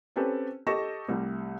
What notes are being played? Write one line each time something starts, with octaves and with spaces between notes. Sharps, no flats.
C4 C#4 G4 A4 B4
G4 A4 D#5 C#6 A#6 E7
C2 G3 A3